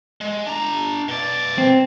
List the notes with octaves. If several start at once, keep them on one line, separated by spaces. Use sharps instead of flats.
G#3
D4 A#5
B2 D5
C4